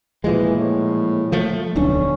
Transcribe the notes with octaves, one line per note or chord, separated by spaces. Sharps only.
A#2 E3 F3 G#3
A2
F3 A3
D1 B1 C#4 D4